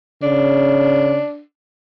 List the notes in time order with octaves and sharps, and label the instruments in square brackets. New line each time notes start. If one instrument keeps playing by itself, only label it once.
[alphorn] C#3 [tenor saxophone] D4